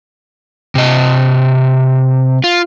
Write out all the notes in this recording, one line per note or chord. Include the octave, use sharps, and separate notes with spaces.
C3 D#5
F4